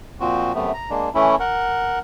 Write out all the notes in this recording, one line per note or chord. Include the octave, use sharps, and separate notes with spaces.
A#2 F3 C4 F#4
F#2 C3 A3 B3
A#5
G#3 A#3 D4
E3 A3 C#4 E4
A#4 F#5